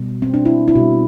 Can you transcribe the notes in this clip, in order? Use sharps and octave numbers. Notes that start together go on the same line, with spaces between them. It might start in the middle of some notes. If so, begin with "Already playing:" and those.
Already playing: B2 G3
C4
D4
E4
E4
B2 G3 F#4